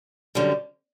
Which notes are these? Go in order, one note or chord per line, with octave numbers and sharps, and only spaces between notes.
F#2 D3 G3